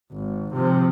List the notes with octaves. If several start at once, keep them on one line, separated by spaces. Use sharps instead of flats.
G#1
C3 F3